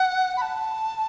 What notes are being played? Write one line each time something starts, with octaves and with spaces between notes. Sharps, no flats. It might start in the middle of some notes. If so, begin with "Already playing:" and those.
Already playing: F#5
B5
A5